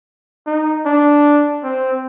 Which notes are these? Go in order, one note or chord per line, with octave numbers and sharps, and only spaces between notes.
D#4
D4
C4